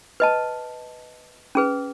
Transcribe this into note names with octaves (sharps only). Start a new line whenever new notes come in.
B4 D#5 A5
C#4 G#4 B4